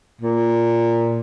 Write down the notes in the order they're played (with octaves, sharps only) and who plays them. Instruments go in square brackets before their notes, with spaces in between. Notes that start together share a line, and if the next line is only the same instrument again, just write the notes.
[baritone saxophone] A#2